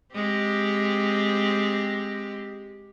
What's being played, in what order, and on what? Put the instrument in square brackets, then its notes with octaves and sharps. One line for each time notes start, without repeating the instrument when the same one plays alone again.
[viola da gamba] G#3 C4 G4